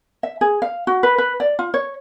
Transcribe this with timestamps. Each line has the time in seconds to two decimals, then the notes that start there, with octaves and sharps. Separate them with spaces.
0.23 E5
0.41 G#4
0.62 F5
0.87 F#4
1.03 B4
1.18 B4
1.40 D5
1.59 F4
1.74 C#5